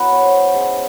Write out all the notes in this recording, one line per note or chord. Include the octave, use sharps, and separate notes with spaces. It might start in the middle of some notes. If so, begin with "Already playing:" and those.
Already playing: F#3 B3 E4 B4
C#5
C5
G#3 C#4 E4